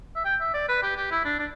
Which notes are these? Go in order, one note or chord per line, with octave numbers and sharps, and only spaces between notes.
E5
G5
E5
D5
B4
G4
G4
E4
D4
D4